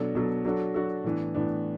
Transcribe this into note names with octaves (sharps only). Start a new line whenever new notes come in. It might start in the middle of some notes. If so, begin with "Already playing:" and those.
Already playing: B2 F#3 D4 A4
B2 F#3 D4 A4
F#3 D4 F#4 A4
F#3 D4 F#4 A4
A2 E3 B3 D4
A2 E3 B3 D4